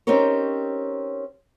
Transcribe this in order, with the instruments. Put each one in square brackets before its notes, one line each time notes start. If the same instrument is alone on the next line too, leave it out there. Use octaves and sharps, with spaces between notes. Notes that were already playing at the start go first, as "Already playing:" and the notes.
[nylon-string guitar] C4 C#4 D#4 G4 A#4 C#5